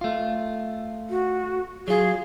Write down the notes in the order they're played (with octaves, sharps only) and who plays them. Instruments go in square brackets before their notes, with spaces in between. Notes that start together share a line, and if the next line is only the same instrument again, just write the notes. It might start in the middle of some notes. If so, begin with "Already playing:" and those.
[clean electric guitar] A3 F4
[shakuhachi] F#4
[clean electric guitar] F#3 F4 [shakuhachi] G#4